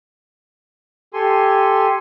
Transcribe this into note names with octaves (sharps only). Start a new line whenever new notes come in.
G4 A4 G#5 C6